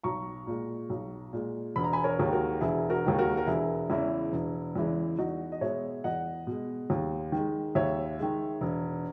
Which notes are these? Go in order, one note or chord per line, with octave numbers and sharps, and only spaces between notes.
B1 A#5 C#6
A#2 G#3
B1
A#2 G#3
E1 B5
A#5
G#5 B5
A#4 C#5
D#2 D#3 G#3
F#4 A#4
E1 E4 G#4
F#4 A#4
D#2 D#3 G#3
F#4 A#4
A#4
E1 E4 G#4
E2 C#3 E3 G#3 E4
E1
E2 C#3 E3 G#3
E2 D#4 F#4
D#5
B2 G#3 C#5 E5
E2 D#5 F#5
B2 G#3
D#2
D#3 G#3
D#2 C#5 E5
D#3 G#3
E1